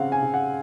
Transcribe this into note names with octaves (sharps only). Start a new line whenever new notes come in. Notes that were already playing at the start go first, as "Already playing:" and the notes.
Already playing: C#3 C4 F5 F#5
G#5
C#3
F#5